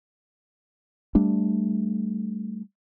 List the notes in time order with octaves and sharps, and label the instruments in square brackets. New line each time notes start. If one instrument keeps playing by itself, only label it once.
[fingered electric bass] G3 A3 D4